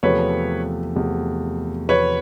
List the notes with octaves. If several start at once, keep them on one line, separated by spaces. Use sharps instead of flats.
E2 C3 F3 A3 B4 C#5
E2 C3 F3 A3
E2 C3 F3 A3 B4 C#5